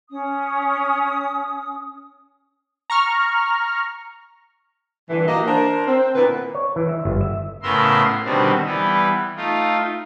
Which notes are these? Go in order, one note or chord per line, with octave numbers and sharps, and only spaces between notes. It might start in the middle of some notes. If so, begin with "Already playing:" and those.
C#4 D#6
A#5 C#6 F6
G2 A#2 D3 E3
A#3 F#4 G4 D#5
D4 A#4 C5
C4
A#2 D3 B3 E4 A#4 B4
C#5
E3
E5
G1
E5
A2 C#3 B3 A#4 E5 C6
B2 D3 D#3 G3 B3 C4
E3 G3 B3
A3 D#4 F4